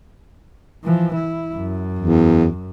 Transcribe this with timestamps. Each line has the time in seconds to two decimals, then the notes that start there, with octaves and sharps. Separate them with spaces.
0.84 E3 F3
1.15 E4
1.55 F#2
1.99 E2